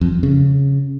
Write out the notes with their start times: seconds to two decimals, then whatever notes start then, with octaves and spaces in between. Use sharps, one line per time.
0.01 F2
0.12 F2
0.23 C#3